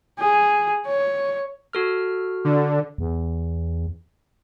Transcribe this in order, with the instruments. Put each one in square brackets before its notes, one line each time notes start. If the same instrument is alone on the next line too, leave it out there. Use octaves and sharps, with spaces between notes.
[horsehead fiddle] G#4
C#5
[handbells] F#4 A4 F6
[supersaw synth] D3
[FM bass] E2